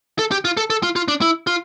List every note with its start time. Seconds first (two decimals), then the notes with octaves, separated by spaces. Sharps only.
0.19 A4
0.31 G4
0.45 F4
0.57 A4
0.70 A4
0.83 F4
0.96 F4
1.08 D4
1.21 E4
1.47 F4